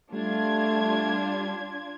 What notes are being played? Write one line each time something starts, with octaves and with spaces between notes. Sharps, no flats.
G3 A3 D4 F4 G#6